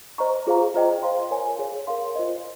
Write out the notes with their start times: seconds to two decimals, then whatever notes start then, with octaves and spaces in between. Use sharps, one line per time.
0.18 C5 D#5 A#5 C#6
0.47 F4 G#4 C5 F5 A#5
0.74 F4 C5 D#5 G5 A#5
1.03 C5 F5 C6
1.31 A#4 C#5 G#5
1.59 G#4 C#5 F5
1.87 A#4 C#5 F5 C6
2.16 F4 C5 D#5